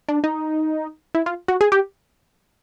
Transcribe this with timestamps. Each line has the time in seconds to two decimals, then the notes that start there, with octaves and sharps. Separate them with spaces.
0.09 D4
0.24 D#4
1.15 E4
1.26 F4
1.48 F#4
1.61 G#4
1.72 G4